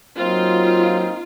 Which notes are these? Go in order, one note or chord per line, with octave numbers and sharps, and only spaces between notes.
F#3 A#3 C4 D#4 F4